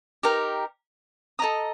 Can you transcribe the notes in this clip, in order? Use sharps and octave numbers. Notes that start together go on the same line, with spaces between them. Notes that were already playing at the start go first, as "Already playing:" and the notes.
D#4 G4 A#4
A4 D#5 A#5 D#6